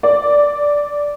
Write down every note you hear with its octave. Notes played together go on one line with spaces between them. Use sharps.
D5